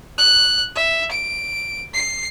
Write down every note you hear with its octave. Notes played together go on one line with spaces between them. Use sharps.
F#6
E5
D7
C7